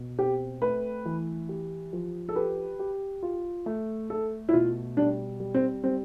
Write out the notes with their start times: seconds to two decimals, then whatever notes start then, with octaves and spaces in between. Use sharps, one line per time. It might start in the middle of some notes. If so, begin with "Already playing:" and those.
Already playing: B2
0.19 C4 G4
0.62 A3 B4
1.05 E3
1.49 G4
1.93 F3
2.29 A4
2.36 G4 B4
2.79 G4
3.23 F4
3.66 A3
4.10 A3 A4
4.49 E4
4.53 B2 F4
4.97 G3 D4
5.40 G3
5.54 C4
5.84 G3 C4